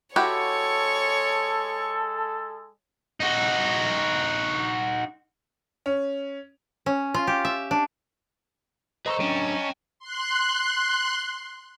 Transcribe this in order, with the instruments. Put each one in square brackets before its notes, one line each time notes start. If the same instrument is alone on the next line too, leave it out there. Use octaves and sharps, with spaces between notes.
[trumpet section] G#3 A4 [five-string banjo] E4 F#4 G4 [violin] C#5 C#6
[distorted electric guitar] D#4 F#4
[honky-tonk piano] C#4
[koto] C#4
F4
G4
E5
D4
[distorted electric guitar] G#4 A4 [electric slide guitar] B4 C5 [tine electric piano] D#5 A#5 C#6
[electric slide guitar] F#3 D4 [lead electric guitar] C#4 [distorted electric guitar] G5 A5
[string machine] C6 F#6